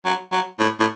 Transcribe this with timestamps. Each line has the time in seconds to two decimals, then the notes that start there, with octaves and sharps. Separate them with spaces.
0.05 F#3
0.32 F#3
0.59 A2
0.80 A2